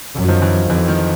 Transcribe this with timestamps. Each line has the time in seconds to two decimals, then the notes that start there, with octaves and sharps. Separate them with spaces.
0.14 F#2
0.24 F#3
0.28 D#3 F3
0.42 E3
0.69 F2 E3
0.88 D#3 F3